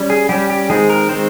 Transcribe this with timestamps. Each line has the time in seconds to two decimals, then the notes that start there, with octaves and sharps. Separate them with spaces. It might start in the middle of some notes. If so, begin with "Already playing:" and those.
Already playing: G3 C#4
0.10 G#4
0.29 G3 C#4 G4
0.50 G4
0.70 D#3 G#3 C4 G#4
0.89 A#4
1.09 D#3 G#3 C4 C5